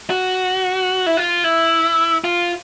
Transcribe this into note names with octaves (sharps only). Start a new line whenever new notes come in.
F#4
E4
F4
E4
F4